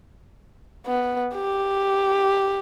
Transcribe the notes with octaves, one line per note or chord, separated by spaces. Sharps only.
B3
G4